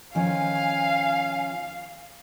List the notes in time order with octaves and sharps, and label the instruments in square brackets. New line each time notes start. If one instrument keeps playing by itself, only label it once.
[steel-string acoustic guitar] D#3 F3 C#4 [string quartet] F5 [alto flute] G#5